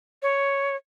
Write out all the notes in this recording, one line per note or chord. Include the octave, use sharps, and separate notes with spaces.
C#5